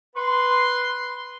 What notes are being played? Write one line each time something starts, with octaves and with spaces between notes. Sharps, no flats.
B4 C6